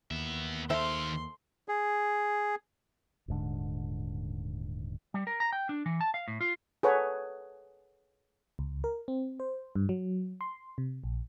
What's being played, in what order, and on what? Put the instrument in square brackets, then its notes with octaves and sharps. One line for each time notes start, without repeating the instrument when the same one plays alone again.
[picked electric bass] D#2 [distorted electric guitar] B3 E5
[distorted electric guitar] D#3 F5 [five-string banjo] A4 C5 E5 [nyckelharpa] C6
[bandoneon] G#4
[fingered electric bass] D#1 G#2 D3
[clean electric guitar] G3
A#4
A#5
G5
D4
E3
A5
F5
A2
F4
[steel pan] G#4 A4 B4 C#5 F#5
[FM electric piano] C#2
A#4
C4
C5
G2
F#3
C6
C3
A#1